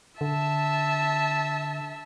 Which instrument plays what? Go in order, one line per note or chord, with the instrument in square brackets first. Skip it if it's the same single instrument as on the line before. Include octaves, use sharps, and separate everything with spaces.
[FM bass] D3 [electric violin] E5 A5